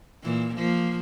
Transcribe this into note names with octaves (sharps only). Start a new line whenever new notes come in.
A#2 E3
F3 A#3